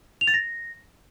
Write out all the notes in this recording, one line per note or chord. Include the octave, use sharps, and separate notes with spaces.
F7
A6
A#6